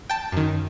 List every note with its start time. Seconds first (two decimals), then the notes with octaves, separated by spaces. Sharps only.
0.09 G5 A5
0.32 F#2 D#3